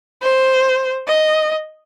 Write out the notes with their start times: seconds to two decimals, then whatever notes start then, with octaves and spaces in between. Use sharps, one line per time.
0.22 C5
1.07 D#5